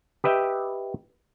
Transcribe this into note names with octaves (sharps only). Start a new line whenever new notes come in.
G4 B4 D#5 E5 G5